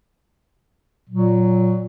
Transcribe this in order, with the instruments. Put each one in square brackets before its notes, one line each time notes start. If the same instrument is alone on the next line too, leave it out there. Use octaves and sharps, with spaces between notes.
[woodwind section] A#2 F#3